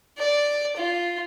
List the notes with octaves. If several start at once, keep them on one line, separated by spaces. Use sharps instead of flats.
D5
F4